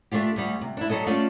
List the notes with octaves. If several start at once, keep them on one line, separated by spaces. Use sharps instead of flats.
A3 D4 F4 G4
D2 G3
C3
D4 E4
F#3 G3 A4 D#5
A3 C#4 D4 F4 D5